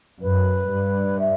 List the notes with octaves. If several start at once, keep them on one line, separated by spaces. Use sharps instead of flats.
F#2 B4
G2
E5